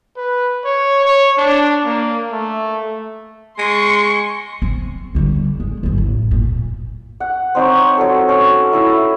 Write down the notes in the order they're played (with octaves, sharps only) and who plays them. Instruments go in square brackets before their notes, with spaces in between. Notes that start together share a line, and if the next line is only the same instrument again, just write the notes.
[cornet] B4
C#5
C#5
D4
A#3
A3
[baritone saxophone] G#3 [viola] C6 C#6
[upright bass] C4
D3 G3
G#3
G1 F#2
A1
A#2
[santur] F#5
C4 D#4 C5 C#5
F#3 F#4 A4
C#4
E4 E5